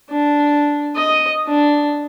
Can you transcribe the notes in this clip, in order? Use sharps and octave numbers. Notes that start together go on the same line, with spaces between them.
D4
D#5
D4